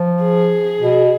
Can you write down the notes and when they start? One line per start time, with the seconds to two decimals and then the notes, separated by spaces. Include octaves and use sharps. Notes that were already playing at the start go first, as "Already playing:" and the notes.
Already playing: F3
0.23 G#4
0.81 B2